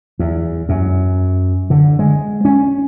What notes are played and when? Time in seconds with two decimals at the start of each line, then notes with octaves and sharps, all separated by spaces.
0.19 E2
0.69 F#2
1.70 D3
1.99 G#3
2.45 C#4